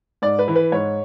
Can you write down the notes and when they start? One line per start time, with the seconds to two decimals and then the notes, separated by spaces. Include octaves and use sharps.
0.22 G#2 D5
0.39 B4
0.48 E3
0.56 B4
0.72 G#2 C#5